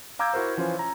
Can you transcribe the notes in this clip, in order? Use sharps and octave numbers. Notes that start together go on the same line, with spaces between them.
F5 A#5 D6 E6 G6 G#6
E4 F#4 A#4 C5
E3 F3 C#4 F4 C5
A#5